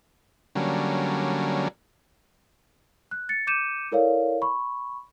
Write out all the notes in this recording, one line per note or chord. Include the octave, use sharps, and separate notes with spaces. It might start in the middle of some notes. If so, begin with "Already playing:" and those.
D3 F#3 G3 A#3 C#4
F#6
A6 C#7
D6 G6 C#7 D#7 E7
E4 A4 A#4 C#5 D5 F5
B5 C#6